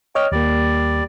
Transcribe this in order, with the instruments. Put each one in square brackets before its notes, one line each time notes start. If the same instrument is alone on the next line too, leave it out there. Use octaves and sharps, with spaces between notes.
[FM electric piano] C#5 D#5 F6 [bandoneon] G5
[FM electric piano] D#2 A#3 [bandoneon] G3 D5